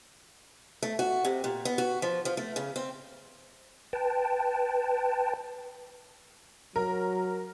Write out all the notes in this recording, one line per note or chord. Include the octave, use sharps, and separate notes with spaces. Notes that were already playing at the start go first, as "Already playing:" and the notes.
A3
F#4
C3
A#2
B3
F#4
F3
F3
A3
C#3
C4
B4 G5 A5
F#3 A#4